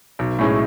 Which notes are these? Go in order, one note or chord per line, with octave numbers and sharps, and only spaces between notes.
B1
A2 G#3 C#4 E4